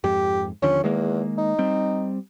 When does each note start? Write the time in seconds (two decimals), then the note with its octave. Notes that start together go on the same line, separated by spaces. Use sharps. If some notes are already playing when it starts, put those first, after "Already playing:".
0.04 F2 G#2 G4
0.62 D#2 D3 F3 C#4
0.84 E2 D#3 G#3 A#3
1.38 D#4
1.59 G3 C4